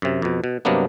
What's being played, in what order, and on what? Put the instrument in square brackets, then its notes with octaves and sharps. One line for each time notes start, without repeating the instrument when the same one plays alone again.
[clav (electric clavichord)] F#2 C3
F2 B2
B2
G2 C3 F#3 A#3 B3 D4